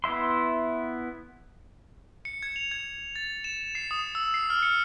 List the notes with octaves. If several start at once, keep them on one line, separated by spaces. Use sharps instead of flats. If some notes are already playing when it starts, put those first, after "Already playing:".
B3 E4 E5 C6
C#7
G#6
F7
G#6
A6
E7
C7
D#6
E6
C7
F6
C#7